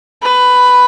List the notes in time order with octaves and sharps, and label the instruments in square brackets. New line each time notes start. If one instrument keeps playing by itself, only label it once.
[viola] B4